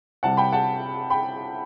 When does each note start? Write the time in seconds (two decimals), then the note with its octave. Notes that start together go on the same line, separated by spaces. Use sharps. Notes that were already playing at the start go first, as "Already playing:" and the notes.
0.23 C2 C3 G3 F#5 A5
0.37 G5 B5
0.52 F#5 A5
1.10 G5 B5